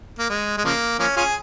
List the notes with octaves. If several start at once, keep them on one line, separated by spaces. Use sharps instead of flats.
A#3
G#3
G#3
C#3 F3 A#3
F3 A#3 C#4
C#4 F4 G#4